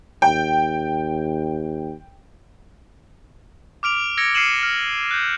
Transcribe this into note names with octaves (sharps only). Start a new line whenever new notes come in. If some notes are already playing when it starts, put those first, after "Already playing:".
D#2 G5
D6 F6 D7 F7
E6 G#6 A#6 C#7 D7
F6 C7 C#7 D#7 E7 F#7
F6
F#6 G6